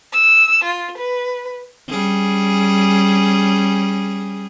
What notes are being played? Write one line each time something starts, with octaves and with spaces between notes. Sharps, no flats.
E6
F4
B4
G3 C#4 G#4